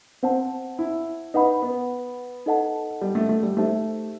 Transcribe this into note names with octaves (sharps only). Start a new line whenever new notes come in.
C4 C5 F#5 A5
E4
D#4 B4 F#5 B5
B3
D#4 A4 D#5 F#5 A5
G3
A3
A3
G3
A3 D#4 G4 C5 E5 A5